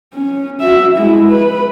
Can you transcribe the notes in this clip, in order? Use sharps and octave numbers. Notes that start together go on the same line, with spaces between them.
C#4
F#4 E5
G#3 E4
B4